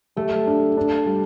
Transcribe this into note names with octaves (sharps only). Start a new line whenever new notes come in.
A3 G4
D4
D4
G3